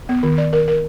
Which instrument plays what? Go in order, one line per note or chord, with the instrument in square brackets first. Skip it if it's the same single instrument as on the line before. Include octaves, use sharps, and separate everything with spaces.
[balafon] B3
D#3
D5
A#4
A#4